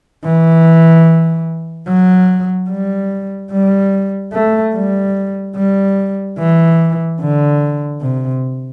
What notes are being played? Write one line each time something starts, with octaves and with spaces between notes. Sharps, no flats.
E3
F#3
G3
G3
A3
G3
G3
E3
D3
C3